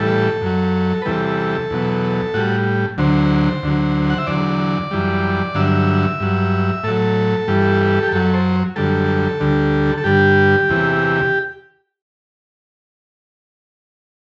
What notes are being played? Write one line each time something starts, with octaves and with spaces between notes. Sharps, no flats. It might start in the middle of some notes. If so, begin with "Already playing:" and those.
Already playing: A2 E3 G3 A4
F#2 F#3
B4
E2 C3 E3 G3 A4
E2 B2 F#3
A2 G3 F#4
D2 D3 F#3 C5
D2 D3 F#3
F#5
E5
E2 D3 F#3 D5
F#2 E3 G3
G2 D3 F#3 E5
G2 F#3
A2 F#3 A4
G2 E3 G3
G4
F#2 F#3 A4
C5
F#2 D3 G3 A4
D2 D3 G3
A4
G2 D3 G3 G4
E2 C3 E3